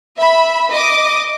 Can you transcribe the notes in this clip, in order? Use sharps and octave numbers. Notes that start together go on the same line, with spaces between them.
E5 B5
D#5 D6 D#6